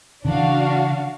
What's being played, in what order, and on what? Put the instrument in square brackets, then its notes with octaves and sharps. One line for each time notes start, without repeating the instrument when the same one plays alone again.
[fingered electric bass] C#3 E3 [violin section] D4 F#4 F5